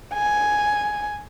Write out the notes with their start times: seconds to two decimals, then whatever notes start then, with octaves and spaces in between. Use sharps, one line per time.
0.14 G#5